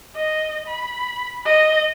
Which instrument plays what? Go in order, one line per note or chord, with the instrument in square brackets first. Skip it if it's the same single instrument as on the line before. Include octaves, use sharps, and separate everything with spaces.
[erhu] D#5
B5
D#5